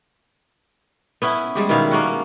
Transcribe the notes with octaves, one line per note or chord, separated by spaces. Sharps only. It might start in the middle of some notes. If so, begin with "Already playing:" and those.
B3 C#4 E4
G3 G#3 G4
B2 D#3 E4 F5
A#3 C#4 F#4